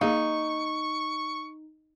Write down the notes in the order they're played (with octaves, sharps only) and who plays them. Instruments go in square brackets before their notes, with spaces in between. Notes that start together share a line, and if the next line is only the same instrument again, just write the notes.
[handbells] A#3 G#4 F5 [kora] D#4 [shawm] C#6